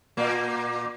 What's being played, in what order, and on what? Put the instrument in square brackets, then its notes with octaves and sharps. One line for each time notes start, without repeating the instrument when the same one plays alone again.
[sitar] A#2 A#3